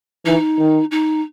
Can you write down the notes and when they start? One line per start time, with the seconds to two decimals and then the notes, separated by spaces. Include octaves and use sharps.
0.25 E3 D#4
0.58 D#3
0.91 D#4